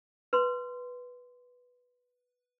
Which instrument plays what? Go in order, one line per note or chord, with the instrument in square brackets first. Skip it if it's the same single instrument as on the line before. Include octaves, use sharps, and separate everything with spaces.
[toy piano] B4 C6